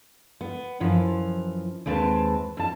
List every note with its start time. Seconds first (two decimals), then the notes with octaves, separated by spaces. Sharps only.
0.41 B3
0.80 F#2 E3 F3
1.86 D#2 G#3 C4 B4 A5
2.57 F2 A5